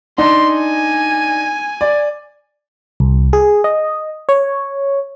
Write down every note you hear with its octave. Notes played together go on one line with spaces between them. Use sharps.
D4 D#4 C6
G#5
D5
C2
G#4
D#5
C#5